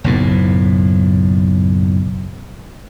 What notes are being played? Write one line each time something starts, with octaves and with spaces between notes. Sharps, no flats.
F#1 B1 A2